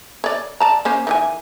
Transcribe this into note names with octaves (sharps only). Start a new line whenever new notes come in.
C#5 D5
D5 A5 A#5
A#3 C#4 C5
D#3 E3 G#5